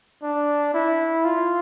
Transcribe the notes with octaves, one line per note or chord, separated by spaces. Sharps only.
D4
E4
F4